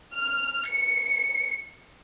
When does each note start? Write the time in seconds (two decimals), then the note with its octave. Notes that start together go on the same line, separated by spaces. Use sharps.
0.14 F6
0.68 C#7